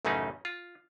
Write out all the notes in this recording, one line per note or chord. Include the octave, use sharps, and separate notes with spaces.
A1 F#2 C#3 A3 C#4 D#4
F4